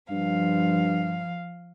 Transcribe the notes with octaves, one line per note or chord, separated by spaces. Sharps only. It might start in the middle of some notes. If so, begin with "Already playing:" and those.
G2 F3 F5